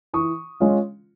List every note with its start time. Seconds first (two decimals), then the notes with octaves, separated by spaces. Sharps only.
0.13 E3 C#6 D#6
0.60 G#3 C#4 F4